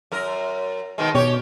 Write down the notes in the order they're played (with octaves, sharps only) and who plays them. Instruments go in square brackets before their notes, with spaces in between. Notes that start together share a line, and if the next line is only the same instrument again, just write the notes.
[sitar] F#2 A#4
B2 D#3 G#3
[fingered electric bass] B2 [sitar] G4 C#5